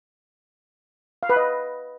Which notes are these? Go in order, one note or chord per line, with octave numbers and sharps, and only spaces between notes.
F5
B4
D#5